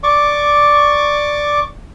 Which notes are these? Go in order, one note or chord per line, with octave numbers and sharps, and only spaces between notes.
D5 C#6 D6